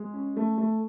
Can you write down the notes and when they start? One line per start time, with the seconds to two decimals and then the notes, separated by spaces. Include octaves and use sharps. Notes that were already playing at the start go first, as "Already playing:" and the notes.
Already playing: G#3
0.14 C#4
0.37 A3
0.58 A3